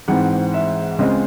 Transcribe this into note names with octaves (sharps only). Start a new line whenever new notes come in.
G#2 E3 C4 F#5
E5
C#2 C#3 G#3 C4 D#5